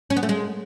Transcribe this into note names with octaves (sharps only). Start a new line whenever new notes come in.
C#4
B3
A3
G#3